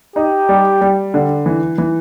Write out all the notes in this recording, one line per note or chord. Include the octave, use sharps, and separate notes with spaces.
D#4 G4
G3
G3
D3
E3
E3